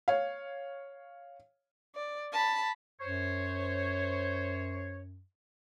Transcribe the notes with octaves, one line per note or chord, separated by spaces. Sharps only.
C#5 F5
D5
A5 B5
F#2 C5 C#5